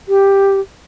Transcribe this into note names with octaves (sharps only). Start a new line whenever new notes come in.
G4